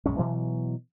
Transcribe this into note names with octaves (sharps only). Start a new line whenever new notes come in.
A#1 F#2 G#3 C#4
B2 E3 F#3